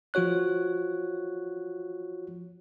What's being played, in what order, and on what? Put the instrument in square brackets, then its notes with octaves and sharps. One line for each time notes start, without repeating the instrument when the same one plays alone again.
[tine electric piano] F3 F4 F#4 C#5 F#6